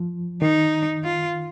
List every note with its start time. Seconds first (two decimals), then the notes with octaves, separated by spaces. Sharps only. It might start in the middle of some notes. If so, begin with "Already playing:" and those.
Already playing: F3
0.42 D#3 D#4
1.04 F4